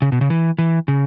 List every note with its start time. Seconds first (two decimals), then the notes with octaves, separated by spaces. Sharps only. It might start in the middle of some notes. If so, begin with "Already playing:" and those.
0.02 C#3
0.12 B2
0.21 C#3
0.30 E3
0.58 E3
0.88 C#3